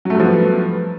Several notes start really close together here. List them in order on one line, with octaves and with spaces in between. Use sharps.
F#3 A3 G2 F3 B3